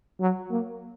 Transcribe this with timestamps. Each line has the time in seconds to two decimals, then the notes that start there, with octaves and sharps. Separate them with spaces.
0.20 F#3
0.51 A#3